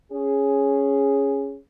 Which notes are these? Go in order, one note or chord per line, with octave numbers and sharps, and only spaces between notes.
C#4 G#4